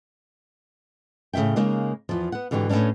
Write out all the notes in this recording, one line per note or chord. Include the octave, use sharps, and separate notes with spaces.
A2 C#3 E3 E5 G5
C#3 G#3 A#3 D#4
E2 F3
B3 F#5
G#2 D3 E3 F#4 G4
A2 A3 B3 C#4 D4